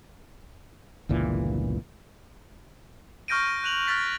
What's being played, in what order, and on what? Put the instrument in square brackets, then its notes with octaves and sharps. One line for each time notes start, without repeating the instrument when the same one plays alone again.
[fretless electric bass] G1 C#2 A#2 E3
[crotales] C#6 F6 G6 A#6 D7 D#7
F#6 D#7 F7 F#7
F6 F#6 A6 B6